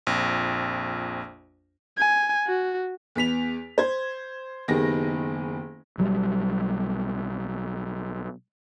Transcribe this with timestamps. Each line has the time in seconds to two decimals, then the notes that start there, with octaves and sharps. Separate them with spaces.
0.07 A#1 F2
1.98 G#5
2.47 F#4
3.15 E2 B3 B6 F7
3.78 C5 G#6
4.68 F#1 D#3 B3 G4 G#4 A#6
5.98 B1 F#3 G3